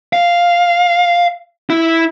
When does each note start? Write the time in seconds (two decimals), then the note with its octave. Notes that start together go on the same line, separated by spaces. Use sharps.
0.13 F5
1.70 E4